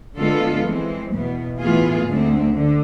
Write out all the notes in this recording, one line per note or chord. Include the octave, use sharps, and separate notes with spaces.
D3 G#3 B3 F4 A4
E3 G#3 C4
E2 B2 B3
A2 E3 B3 F4 G#4
D2 D3 G#3 C4
D3